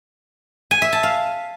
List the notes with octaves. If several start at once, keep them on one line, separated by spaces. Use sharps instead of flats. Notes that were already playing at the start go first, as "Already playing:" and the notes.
G#5
E5
A5
F5